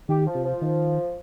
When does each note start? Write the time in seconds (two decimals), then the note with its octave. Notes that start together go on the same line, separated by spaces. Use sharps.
0.09 D#3 G4
0.26 F3
0.35 C3
0.45 F3
0.62 D#3